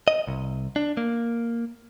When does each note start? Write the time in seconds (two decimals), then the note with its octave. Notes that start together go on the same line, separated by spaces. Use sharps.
0.08 D#5
0.27 C2
0.76 D4
0.97 A#3